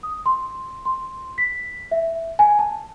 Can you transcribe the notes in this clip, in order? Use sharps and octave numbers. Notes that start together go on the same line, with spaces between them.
D#6
C6
C6
B6
E5
G#5
A5